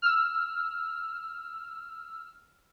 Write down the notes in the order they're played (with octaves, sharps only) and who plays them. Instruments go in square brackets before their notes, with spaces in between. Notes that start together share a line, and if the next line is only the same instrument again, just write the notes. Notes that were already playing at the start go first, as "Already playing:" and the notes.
[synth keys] E6 F6